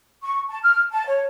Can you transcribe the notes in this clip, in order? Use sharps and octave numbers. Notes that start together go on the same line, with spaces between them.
C#6
A5
F6
A5
C#5